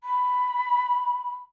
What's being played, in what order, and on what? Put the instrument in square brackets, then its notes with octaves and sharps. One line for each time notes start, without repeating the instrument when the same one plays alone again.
[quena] B5